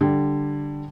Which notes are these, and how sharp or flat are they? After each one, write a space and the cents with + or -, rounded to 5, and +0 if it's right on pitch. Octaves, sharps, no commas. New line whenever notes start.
D3 +0 G3 +0